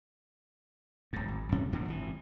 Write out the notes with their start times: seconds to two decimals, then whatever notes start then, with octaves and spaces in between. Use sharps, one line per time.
1.13 D1 G#2
1.28 G#1
1.52 F#2 C3 C#4
1.72 D1 A#1 B2 D3
1.88 G#1 E3